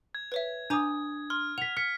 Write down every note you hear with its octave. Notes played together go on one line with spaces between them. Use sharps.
G#6
B4 C#5 E5
D4 G#5 A#5 D6 D#6
C6 F6
F#5 B6 F7
F6 B6 C#7